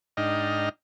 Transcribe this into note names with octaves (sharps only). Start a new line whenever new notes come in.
G#2 D4 D#4 D#5 G5 F6